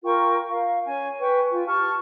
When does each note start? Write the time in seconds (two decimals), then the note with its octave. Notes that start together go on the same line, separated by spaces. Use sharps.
0.04 F4 A#4 G5 C#6
0.49 F5
0.85 C#4 G#5
1.19 B4 G5 C#6
1.50 F4
1.67 G4 A5 C#6 F6